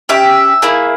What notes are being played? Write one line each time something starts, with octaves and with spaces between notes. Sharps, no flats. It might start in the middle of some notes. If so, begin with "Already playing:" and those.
C#4 G4 E5
A#3 E4 G#4